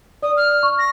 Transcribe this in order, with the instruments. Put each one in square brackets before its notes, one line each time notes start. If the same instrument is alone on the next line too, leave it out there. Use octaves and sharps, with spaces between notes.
[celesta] D5 [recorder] D#6
[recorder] F6
[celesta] C#6
[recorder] A#6